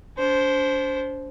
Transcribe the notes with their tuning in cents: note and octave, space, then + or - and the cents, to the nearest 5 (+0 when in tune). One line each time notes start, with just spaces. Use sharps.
D4 -40 C5 +0